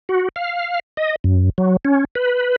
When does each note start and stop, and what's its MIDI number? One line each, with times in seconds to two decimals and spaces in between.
0.09 0.29 66
0.36 0.79 77
0.97 1.16 75
1.24 1.50 42
1.58 1.77 54
1.85 2.05 61
2.15 2.56 71